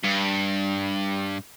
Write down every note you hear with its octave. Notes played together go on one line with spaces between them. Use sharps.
G2